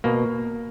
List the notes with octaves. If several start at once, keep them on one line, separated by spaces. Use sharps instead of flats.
B2 A#3